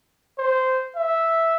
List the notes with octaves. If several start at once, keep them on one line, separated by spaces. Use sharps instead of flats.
C5
E5